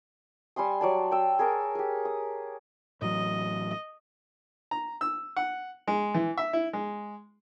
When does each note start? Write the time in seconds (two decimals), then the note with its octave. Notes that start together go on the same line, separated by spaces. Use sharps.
0.56 G3 G#5 C6 D#6
0.81 F#3 D5 A5
1.11 G5 E6
1.39 G#4 A#4 C#5 A5
1.75 G4 G#4
2.05 D#6
3.02 A2 E3 F#3 D#5
4.71 A#5
5.01 E6
5.36 F#5
5.87 G#3
6.14 E3
6.38 E5
6.53 E4
6.73 G#3